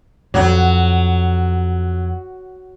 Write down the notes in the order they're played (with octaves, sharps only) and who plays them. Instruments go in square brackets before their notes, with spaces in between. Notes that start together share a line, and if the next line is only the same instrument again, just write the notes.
[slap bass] F2 [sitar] F#3